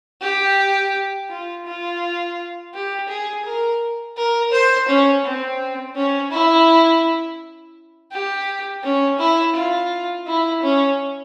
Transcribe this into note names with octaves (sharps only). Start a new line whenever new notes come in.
G4
F4
F4
G4
G#4
A#4
A#4
C5
C#4
C4
C#4
E4
G4
C#4
E4
F4
E4
C#4